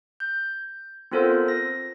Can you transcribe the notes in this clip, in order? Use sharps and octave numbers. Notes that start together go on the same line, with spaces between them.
G6
B3 C4 F4 A4 A#4 C5
A#6